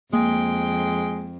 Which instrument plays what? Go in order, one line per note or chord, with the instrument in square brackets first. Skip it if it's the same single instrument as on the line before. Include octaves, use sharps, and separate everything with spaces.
[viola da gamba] F2 [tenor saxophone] G#3 [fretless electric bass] A#3 [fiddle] G5